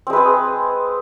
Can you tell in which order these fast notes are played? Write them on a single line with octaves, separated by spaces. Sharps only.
C4 G#3 B4 G#4